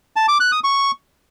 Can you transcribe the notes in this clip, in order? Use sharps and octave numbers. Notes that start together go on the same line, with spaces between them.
A5
D6
F#6
D#6
C#6